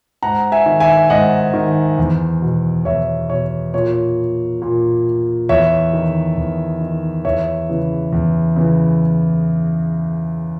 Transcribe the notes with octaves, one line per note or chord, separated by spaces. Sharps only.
G#2 F#5 A#5
E5 G#5
D#3
E5 G#5
G#2 D#5 F#5
D#3
E2
B2
E2 C#5 E5
B2 C#5
A#2 C#5
A#2
E2 C#5 E5
D#3
E2
D#3
E2 C#5 E5
C#3 E3
E2
C#3 E3